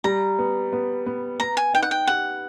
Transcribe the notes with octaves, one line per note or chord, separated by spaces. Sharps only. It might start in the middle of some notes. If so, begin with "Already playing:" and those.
G3 A#5
B3
B3
B3
B3 A#5
G#5
D#4 G5
F#5
G5
G4 F#5